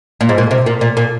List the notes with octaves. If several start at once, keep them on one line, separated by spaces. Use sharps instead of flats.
A#2
G#2
A#2
C3
A#2
A#2
A#2